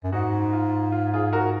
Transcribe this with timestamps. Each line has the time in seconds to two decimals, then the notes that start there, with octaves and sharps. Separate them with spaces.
0.04 F#2
0.12 G#2 D#4 F#4
0.53 F4
0.92 F4
1.14 F4 G#4
1.33 F#4 A#4